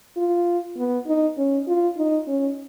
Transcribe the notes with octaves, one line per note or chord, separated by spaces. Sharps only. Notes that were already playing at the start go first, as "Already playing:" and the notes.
F4
B3
D#4
C#4
F4
D#4
C#4